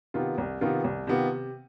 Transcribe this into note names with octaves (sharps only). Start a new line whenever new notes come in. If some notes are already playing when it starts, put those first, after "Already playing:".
C3 D#3 B3 F4
C2
C3 D#3 B3 F4
C2
C3 D#3 B3 F4
C3